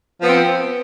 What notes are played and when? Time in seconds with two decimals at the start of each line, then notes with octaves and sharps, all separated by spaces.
0.20 F3
0.23 B3
0.27 C4